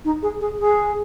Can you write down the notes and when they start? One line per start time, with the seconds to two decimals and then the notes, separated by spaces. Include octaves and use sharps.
0.04 D#4
0.22 G#4
0.40 G#4
0.59 G#4